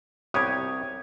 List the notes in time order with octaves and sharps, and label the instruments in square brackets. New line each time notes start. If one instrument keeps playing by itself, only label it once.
[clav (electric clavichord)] C2 G4 C#5 [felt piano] D#6 G#6